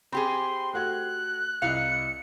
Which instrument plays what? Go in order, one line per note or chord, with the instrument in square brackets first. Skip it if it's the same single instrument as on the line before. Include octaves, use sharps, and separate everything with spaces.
[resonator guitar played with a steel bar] C4 G4 G#4 [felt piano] B5 [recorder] C6
[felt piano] A3 F#4 G#6 [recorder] F#6
[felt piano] C2 E4 D#5 [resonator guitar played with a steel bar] F5 [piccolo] C#7